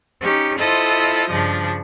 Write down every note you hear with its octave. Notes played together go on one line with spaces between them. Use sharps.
C#4 D#4 G4
E4 F4 A4 C5 D#5
G2 C#3 F3 D4